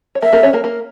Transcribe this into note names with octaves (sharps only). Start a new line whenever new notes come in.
C#5
A#3 A#4 E5
A#3 A#4
C#4 C#5
A#3 A#4
A#3 A#4